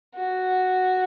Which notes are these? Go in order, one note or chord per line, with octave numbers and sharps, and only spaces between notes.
F#4